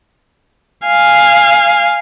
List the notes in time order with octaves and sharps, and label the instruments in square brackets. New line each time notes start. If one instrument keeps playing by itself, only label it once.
[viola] F5 G#5